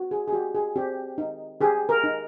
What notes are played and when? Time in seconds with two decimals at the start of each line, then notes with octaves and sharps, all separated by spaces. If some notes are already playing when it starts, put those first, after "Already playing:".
Already playing: F#4
0.11 G#4
0.28 G#4
0.33 F#4 G4
0.55 G#4
0.76 C4 G4
1.18 D#4
1.61 G4 G#4
1.89 A#4
2.04 D#4